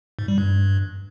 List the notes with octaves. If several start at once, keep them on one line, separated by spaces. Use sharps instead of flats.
G#2
G3
G2